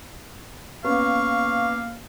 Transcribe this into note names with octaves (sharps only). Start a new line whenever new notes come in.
A#3 B3 C#4 B4 F5 C#6